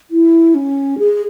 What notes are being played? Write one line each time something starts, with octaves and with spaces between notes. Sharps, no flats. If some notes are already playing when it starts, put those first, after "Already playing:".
E4
C#4
G#4